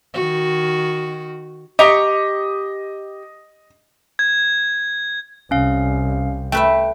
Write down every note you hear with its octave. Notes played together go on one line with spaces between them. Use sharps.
D#3 F#4
G4 D#5 A#5 C#6
G#6
C2 C#4 F5
A3 B4 E5 G5